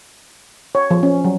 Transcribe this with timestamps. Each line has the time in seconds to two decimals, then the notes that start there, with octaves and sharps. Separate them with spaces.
0.75 C#5
0.91 F3
1.03 C#4
1.25 F#3